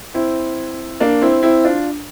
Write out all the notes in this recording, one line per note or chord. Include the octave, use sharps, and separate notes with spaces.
C4 E4
A#3 D4
C4 E4
C4 E4
D4 F4